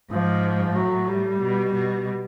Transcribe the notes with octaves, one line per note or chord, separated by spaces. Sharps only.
G#2 F3
A2 F#3
G3
B2
B2